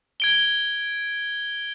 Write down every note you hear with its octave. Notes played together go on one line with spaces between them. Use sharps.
G#6 D7 G7